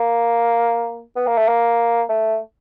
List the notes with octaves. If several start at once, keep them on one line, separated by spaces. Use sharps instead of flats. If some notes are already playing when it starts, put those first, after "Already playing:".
Already playing: A#3
B3
A#3
A3
A#3
A3